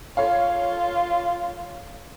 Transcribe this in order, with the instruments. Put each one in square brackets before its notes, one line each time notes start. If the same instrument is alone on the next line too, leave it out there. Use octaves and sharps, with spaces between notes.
[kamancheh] F4 [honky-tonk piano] A4 C#5 F5